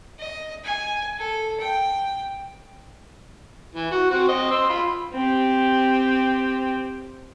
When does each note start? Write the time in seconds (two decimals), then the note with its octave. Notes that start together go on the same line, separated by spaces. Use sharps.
0.19 D#5
0.65 G#5
1.19 A4
1.60 G5
3.75 E3
3.91 F#4
4.11 C4 F#4
4.28 C4 D#5
4.51 C6 E6
4.69 F4 B5
5.14 C4 G4